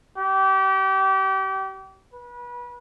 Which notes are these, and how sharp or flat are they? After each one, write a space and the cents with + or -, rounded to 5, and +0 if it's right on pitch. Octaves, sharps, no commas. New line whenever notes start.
G4 -30
B4 -30